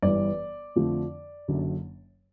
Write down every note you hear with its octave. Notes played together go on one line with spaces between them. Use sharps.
G1 G2 E3 D5
F2 D3 F3 A3
F#1 F#2 D3 F#3